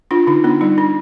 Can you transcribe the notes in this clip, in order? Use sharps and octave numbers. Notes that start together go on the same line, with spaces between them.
D4 F4
D3 D#4
B3 D4
G3 D#4
D4